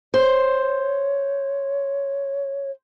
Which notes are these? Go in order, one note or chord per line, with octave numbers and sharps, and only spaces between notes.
C5 C#5